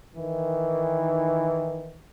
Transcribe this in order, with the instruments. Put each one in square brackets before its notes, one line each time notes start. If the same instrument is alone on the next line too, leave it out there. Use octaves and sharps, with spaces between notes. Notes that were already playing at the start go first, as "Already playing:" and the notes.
[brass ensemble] D#3 E3